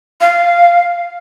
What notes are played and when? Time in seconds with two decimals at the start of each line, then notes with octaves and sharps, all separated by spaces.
0.21 F5